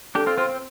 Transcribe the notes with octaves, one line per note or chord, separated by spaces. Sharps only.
D4 G4 A4
C4 F4
C4 F4 C5
C4